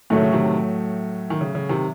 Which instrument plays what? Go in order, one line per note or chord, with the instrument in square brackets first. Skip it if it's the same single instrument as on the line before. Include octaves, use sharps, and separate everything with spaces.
[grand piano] A2 F#3 A3 [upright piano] D#3
[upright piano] C#3
C3 D#3
D#3
C#3
C#3
C3 D#3